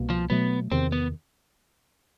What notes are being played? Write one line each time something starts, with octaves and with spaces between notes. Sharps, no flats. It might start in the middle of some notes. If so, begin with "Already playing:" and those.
Already playing: C2 B2 A#3
F3
B2 F#3 A3 B3
E2 C3 D#3 C4
B3